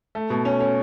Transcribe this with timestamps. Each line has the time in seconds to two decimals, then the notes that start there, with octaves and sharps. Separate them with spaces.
0.15 A3
0.30 B2
0.45 C#4
0.60 C#4